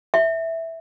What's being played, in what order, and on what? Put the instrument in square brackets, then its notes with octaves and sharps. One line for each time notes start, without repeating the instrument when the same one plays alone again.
[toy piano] E5